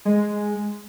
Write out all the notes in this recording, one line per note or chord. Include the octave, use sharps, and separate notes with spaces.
G#3